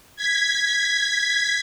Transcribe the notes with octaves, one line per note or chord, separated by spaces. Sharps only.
G#6 B6